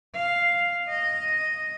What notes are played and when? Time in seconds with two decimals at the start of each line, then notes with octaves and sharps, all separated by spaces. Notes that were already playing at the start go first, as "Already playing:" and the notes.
0.15 F5
0.89 D#5